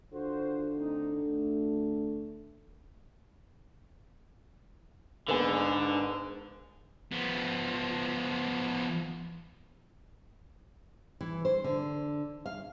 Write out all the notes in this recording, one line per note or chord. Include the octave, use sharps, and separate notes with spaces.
D3 F4 F#4 C5
A3 C4 D#4
D2 A3
G#2 D3 A#3 B3 G#4
F3 B3
E3
C5
D3
F5